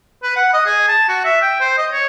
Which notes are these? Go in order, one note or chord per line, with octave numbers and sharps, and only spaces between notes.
B4
F#5
D#5
G#4
A5
F#4
E5
G5
C5
D#5
C#5